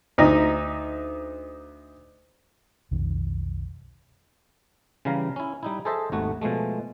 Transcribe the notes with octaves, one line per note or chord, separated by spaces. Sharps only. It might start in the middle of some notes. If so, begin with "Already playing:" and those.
D2 D#4
B1 F2 D#3
C#3 E3 G3 F5 A#5
C#4 E4
G3 D#4 E4
G#4 A4 C5 D#5 E5 A5
G#1 D#2 A3 F#4
B2 F3 G#3 A3